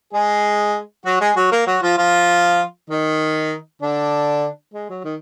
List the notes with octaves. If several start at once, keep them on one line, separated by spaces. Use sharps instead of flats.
G#3 G#4
F#3 F#4
G#3 G#4
F#3 F#4
A#3 A#4
F#3 F#4
F3 F4
F3 F4
D#3 D#4
D3 D4
G#3
F#3
D#3